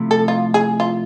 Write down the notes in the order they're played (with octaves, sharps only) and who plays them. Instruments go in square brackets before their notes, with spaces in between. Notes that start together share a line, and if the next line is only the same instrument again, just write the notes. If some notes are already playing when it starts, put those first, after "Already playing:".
Already playing: [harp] C3 F3 A3 E4
[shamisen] A4
F4
G#4
F4